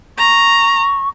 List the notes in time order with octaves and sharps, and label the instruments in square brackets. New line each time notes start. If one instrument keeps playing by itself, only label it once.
[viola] A#5 [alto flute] C#6